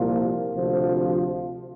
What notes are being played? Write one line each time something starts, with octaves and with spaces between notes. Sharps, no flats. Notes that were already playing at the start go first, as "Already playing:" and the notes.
Already playing: C2 A#2 F3 A#3 F4
D2 C3 F3